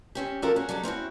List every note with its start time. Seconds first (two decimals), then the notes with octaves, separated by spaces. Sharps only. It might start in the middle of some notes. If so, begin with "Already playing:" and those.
0.15 C4 C#4 G4
0.42 F3 C4 C#4 F#4 A4 A#4
0.56 C#4 F#4 G#4
0.69 F#3 G3 D#4 A4
0.83 C4 C#4 E4 F#4